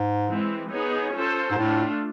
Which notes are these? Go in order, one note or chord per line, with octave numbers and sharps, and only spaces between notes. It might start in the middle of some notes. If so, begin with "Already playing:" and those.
Already playing: G#2
E3 G#3 C4
B3 D#4 G#4 C#5
C#4 F4 A4 C5
G#2
A2 A3 D4 F4